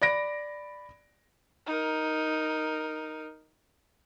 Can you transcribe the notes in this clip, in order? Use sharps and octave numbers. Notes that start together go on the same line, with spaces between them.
D5 B5 A#6 D7
D#4 A#4